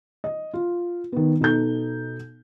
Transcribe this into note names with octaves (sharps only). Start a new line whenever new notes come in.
D#5
F4
D#3 B3
B2 D#4 A4 G6